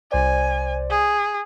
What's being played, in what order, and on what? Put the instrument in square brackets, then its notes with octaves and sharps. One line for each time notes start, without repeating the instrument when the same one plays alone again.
[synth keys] C2 C5 D5 [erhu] G#5
[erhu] G#4